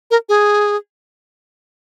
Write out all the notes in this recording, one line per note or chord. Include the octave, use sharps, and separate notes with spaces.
A#4
G#4